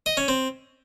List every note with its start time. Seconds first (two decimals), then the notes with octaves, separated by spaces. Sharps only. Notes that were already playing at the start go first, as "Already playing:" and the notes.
0.06 D#5
0.17 C#4
0.28 C4